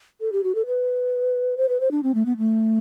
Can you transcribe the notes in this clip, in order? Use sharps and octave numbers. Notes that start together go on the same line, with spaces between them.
A4
G4
F#4
A4
B4
C5
B4
C5
D4
C4
A3
B3
A3